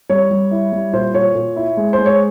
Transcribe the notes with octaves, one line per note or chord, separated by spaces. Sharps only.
G3 C#5
G3
E4
G3
A#2 C5
A#2 C#5
A#2
E4
G#3
C5
G#3
C#5